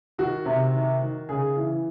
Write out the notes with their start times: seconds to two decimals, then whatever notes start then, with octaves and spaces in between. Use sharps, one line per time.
0.18 D#3 F#4
0.45 C3
0.74 D#3
1.02 D#3
1.29 C#3 G#4
1.57 E3